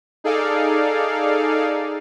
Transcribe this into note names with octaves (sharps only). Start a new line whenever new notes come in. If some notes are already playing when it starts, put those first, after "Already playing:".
D#4 G#4 A4 D5 F5